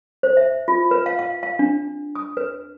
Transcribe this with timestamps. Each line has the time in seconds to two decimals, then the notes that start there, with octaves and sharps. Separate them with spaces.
0.23 C5
0.37 E5
0.68 F4
0.91 B4
1.06 F5
1.19 F5
1.43 F5
1.59 D4
2.15 D#6
2.37 B4